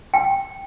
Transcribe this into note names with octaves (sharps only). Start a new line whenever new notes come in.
G5